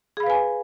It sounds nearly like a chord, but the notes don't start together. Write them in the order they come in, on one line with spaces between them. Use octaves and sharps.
G#4 B5 F5 B4 G#5